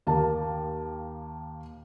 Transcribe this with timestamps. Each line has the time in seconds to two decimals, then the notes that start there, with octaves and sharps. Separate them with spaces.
0.07 D#2 A#3 A5